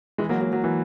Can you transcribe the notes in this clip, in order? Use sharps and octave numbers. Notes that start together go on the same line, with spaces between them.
E3 G#3
F#3 A#3
F#3
F#3
E3